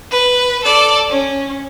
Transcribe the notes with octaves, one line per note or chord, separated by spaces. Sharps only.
B4
A4 D5
C#4